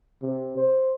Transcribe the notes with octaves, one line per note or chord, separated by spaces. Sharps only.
C3
C5